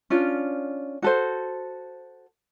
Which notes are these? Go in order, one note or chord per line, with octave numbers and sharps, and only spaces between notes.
C#4 D4 F4
F#4 A4 C5